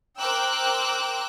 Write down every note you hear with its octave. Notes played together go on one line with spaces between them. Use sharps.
A#4 C5 G5 D6 E6 F#6